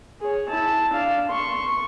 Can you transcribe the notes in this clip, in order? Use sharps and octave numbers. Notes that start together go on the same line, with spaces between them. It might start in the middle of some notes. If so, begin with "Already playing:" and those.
G#4 C#5
E4 A5
D4 F5
C6 C#6